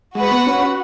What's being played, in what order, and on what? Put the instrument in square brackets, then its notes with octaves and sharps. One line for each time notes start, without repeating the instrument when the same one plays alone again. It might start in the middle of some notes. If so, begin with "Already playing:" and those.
[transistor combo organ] G#3 [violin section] F#4 B4 F#5
[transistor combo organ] B3
C#4
F#4